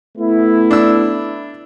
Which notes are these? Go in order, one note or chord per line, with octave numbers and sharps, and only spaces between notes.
A3 B3 E4
D4 E6